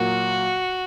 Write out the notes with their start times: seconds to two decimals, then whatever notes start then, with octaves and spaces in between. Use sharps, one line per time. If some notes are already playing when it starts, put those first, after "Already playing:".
Already playing: A#2 F#3 A#3 F#4